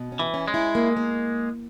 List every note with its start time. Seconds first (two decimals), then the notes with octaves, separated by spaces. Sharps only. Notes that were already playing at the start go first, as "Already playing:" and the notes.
Already playing: B2
0.12 C#4
0.19 E3
0.34 C#4
0.48 G#3
0.54 E4
0.75 A#3
0.97 A#3